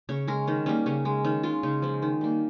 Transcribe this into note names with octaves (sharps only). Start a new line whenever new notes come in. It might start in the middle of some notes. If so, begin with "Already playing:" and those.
C#3 C#5
G#3 A#4
D#3 C#4
G3 A#3 C#4
C#3 C#4
G#3
D#3 C#4
G#3 F4
C#3 D#4
F3 G#3
D#3
G3 A#3